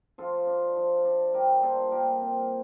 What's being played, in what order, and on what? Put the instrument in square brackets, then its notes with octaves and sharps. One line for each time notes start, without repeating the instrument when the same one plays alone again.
[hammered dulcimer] F3 F4 A4
D4
F3
D4
G3 G4 A#4
A#2 A4 C5
A#2 G4 A#4
C4